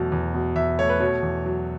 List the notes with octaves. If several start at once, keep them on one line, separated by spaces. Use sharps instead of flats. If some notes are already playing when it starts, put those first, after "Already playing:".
Already playing: E2 B2 F#3 A3
E2
B2
E2 E5
A3 C#5
B4
B2 C#5
E2
F#3